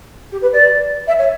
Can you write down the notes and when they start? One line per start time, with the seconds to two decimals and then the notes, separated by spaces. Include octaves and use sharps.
0.31 G4
0.41 B4
0.52 D5
1.07 E5
1.18 C#5